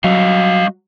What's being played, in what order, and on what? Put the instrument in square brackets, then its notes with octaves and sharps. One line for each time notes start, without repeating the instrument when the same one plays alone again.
[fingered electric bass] F#3 [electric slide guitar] G3 D#5 F5